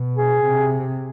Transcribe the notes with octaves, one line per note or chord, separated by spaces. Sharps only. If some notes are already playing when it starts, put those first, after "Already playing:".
Already playing: B2
G#4
C3